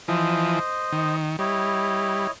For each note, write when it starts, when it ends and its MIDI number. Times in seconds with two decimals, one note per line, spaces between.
0.08 0.59 52
0.08 0.59 53
0.08 1.15 72
0.08 1.15 75
0.92 1.36 51
1.39 2.27 55
1.39 2.31 64
1.39 2.31 73
1.39 2.31 75